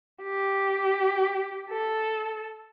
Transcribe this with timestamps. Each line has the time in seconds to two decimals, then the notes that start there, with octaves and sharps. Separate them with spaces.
0.23 G4
1.71 A4